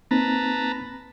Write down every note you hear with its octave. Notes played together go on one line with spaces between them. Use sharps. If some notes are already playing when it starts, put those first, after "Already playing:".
A#3 C4 D#4 B4 A5 A#5